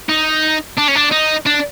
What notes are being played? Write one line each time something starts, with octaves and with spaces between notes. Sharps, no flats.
D#4
D4
C#4
D4
D#4
D4